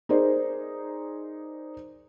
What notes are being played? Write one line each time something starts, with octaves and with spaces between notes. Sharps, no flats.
D#4 G#4 A#4 C5 D5